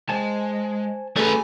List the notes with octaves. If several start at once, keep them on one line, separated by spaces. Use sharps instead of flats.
G#3 C5 G#5 A5
A3 F#4 G#4 B4 C#5 G#5